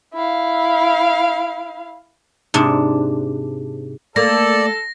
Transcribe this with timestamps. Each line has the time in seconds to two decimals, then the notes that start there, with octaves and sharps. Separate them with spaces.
0.14 E4 F5
2.54 G#2 C3 D4
4.16 A3 A#3 A4 D5 A#6